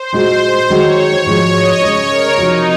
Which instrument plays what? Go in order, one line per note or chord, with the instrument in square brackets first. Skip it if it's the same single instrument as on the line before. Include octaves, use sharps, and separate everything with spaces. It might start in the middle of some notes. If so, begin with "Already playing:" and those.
Already playing: [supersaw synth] C5
[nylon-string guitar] A#2 G#3 D#4 F#4
[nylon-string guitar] D#3 G#3 D#4 F#4 [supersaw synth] C#5
[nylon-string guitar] G#2 F3 G#3 D#4 F#4 [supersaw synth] C#5
[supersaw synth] D#5
[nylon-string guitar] C#3 G#3 D#4 [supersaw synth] C#5
[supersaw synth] A#4
[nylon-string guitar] C3 F3 C4 F#4 [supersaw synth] D#4